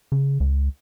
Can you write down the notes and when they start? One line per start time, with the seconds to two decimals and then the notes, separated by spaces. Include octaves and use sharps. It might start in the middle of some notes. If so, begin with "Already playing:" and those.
0.12 C#3
0.40 C#2